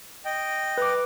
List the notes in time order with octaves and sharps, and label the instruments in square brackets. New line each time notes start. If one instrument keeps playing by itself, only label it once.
[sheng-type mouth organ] D#5 G5
[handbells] B4 D6